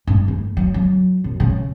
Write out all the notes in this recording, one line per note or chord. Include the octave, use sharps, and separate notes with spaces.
G2
A3
F#3
F#3
F#2
C#3